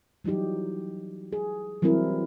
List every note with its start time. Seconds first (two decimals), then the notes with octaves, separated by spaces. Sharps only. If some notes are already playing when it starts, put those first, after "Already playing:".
0.24 E3 F#3 G3 D#4 G4
1.33 G#4
1.82 E3 F#3 G3 C4 E4 A#4